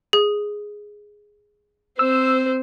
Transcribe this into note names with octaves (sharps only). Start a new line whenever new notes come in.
G#4
C4 C5 E6